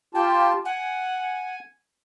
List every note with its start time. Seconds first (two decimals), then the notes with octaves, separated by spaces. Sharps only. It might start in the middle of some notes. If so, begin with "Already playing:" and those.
0.15 F4 G4 G5 A5
0.65 F#5 G#5